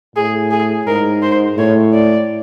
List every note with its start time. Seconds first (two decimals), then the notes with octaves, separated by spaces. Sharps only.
0.16 A2 G#4
0.51 G#4
0.87 G#2 A#4
1.22 C5
1.58 A2 C#5
1.93 D5